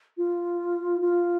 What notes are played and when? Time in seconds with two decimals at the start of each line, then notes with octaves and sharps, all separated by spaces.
0.17 F4
1.01 F4